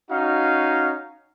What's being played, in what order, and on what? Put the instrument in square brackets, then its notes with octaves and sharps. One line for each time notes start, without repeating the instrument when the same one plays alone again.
[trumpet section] C#4 D#4 F#4 F5